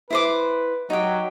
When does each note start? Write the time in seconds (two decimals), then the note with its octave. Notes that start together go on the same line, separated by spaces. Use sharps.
0.10 E4 B4 C5 D6
0.90 F#3 D#4 G4